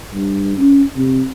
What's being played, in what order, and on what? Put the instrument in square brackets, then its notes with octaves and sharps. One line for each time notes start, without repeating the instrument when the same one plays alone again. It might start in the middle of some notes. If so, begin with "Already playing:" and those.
[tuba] G2
C#4
C3